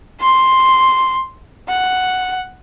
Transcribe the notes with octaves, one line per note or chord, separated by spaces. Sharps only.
C6
F#5